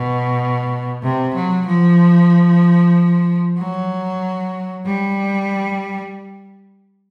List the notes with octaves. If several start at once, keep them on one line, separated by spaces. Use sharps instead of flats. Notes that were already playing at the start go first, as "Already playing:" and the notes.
Already playing: B2
C3
F#3
F3
F#3
G3